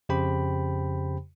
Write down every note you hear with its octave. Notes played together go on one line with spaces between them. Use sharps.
F2 C#3 G4 C5 G5 B5